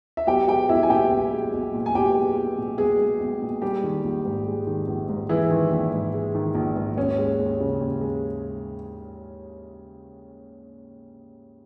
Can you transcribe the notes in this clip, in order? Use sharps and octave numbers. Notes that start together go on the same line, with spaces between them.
E5
B1 G4 G5
G#3 G4 G5
B1 E4 E5
G#5
A#2 G4 G5
B1
G#3
B1
A#2
G#5
B1 G4 G5
G#3
B1
A#2
B1 G#3 G#4
G#3
B1
A#2
G3 G#3 G4
D#3
A#1
G#2
G#3
D#3
A#1
G#2
E3 G#3 E4
D#3
A#1
G#2
G#3
D#3
A#1
G#2
D#2 C#4
G#3
D#2
C#3
D#2
G#3